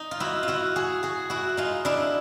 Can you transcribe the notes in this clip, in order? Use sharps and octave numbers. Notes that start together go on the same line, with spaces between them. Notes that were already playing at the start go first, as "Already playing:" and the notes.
Already playing: D#4
F4
E4 F#4
F4
E4 F#4
F#4 G#4
F#4 G#4
E4 F#4
D#4 F4
D4 E4